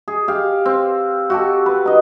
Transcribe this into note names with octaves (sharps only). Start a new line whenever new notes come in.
G#4
G4 F5
C4
F#4 G4 A4
B4
D#4 D#5